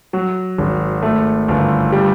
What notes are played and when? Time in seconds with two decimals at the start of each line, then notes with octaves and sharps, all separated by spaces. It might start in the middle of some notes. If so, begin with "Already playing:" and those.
0.13 F#3
0.58 G#1
1.03 A3
1.48 G1
1.92 G3